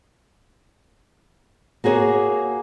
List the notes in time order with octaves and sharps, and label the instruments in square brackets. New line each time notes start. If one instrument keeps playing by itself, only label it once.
[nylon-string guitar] A#3 F#4 G#4 C#5